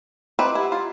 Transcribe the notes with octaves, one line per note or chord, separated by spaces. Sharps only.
C4 B4 D#5 E5 A#5 D6
E4 G4 F#5
F4